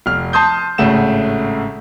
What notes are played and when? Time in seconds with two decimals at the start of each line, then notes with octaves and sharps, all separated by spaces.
0.06 F1 F6
0.33 A5 C6 D#6 G6
0.78 G#1 A2 C#3 A3 F#5 E7